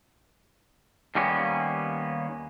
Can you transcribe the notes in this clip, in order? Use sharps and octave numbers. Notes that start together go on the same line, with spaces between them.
D#2 D#3 G3 A#3 B3 C#4